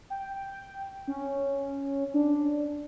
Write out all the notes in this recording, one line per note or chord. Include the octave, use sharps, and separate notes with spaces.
G5
C#4
D4